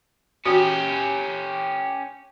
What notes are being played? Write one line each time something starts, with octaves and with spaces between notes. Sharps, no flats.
C#4 F#4 G4